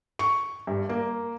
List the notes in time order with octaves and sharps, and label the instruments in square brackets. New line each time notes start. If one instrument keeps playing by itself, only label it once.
[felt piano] C#6
G2
A#3